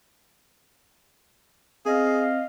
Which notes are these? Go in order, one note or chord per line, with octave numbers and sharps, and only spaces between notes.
C4 G#4 D#5 F5